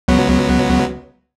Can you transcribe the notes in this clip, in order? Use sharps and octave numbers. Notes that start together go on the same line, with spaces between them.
C#2 F#3 B3